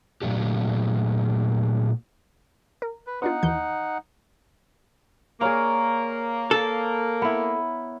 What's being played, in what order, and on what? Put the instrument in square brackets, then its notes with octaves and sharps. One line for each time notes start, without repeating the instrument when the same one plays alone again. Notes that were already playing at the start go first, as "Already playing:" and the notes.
[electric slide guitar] A#2 F#3 A3 D4 G4
[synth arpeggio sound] A#4
[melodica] B4
[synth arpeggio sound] B3 D4 F4 [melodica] D#4 F#5
[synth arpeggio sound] D#2 E3 G6
[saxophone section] A#3 [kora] G#4 F5 [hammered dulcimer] A#4 C#5 D5
[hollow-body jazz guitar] A4
[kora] B3 E4